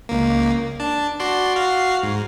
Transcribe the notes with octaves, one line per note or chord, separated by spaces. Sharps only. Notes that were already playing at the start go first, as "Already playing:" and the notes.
C#2 A#3
D4 A5
F#4 D5 C6
F#4 F5 C7
G#2